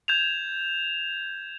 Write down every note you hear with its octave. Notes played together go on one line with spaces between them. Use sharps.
G6 G#6 E7 F7